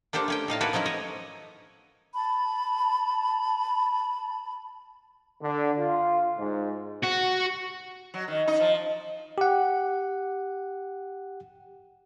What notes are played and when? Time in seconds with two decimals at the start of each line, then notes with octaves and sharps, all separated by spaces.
0.13 A#3 D4 G4 A4 C5
0.28 A3 C#4 G5
0.48 A2 D#4 F5 A5
0.61 A#3 E4 F#4 A4 B4
0.73 F3 F#3 C#4 D#4 E4
0.86 C#5 D#5
2.12 A5 B5
5.41 D3
5.78 F4
6.38 G#2
7.03 F#4
8.14 F#3
8.28 D#3
8.48 D#4
8.60 F3
9.38 G4 F#5